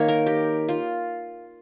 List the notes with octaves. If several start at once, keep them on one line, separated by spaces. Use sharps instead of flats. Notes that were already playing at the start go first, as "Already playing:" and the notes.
Already playing: D#3 A#3 C#5
A#4
G4
F4